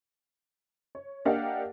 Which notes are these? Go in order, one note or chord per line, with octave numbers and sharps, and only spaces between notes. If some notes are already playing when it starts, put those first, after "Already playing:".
C#5
A#3 D4 G4 D#5 F5 F#5